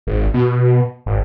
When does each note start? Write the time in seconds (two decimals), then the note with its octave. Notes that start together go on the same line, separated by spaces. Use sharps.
0.07 G#1
0.34 B2
1.06 G#1